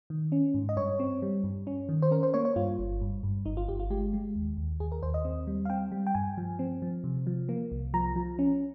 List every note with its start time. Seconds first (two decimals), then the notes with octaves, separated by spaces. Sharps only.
0.10 D#3
0.32 C#4
0.54 G#2
0.69 D#5
0.77 G2 C#5
1.00 C4
1.22 G3
1.44 G2
1.67 C#4
1.89 D#3
2.02 C5
2.11 C#4 A#4
2.23 C5
2.34 A#3 C#5
2.45 C#5
2.56 G2 F4
2.79 G1
3.01 G2
3.23 G2
3.46 G1 D#4
3.57 F4
3.68 G1 G4
3.80 F4
3.90 G#3 G4
4.13 G#3
4.36 D#2
4.57 D#2
4.80 D#2 G#4
4.92 A#4
5.03 D#2 C5
5.14 D#5
5.25 C4
5.47 G3
5.65 F5
5.70 C4 G5
5.92 G3
6.07 G5
6.15 G2 G#5
6.38 F3
6.59 C4
6.82 F3
7.04 C3
7.27 F3
7.49 A#3
7.72 C2
7.94 F3 A#5
8.16 F3
8.39 C#4